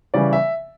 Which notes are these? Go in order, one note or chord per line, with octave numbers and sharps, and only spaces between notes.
C#3 E3 G3 D5
E5